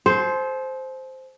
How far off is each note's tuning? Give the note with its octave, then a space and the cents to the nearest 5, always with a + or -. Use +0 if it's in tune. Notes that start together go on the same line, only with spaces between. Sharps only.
A4 -45 C5 +0